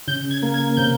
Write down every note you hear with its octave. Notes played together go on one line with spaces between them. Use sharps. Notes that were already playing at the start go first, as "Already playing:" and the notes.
C#3 G6
G#6
A#3
G#6
C3 G6